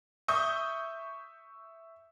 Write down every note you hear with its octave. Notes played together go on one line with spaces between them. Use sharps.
E5 C#6 D#6 G6